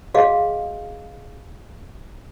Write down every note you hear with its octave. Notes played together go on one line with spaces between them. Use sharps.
F#4 G#4 D#5 F5